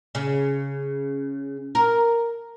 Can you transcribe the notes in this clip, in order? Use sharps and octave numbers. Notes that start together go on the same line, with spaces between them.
C#3
A#4